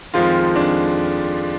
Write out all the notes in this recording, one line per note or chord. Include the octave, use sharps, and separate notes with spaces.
F2 D#3 F3 G#3 F4
F2 D#3 G#3 D4